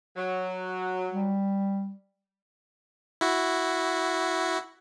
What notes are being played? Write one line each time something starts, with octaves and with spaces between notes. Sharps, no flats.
F#3
G3
E4 F#4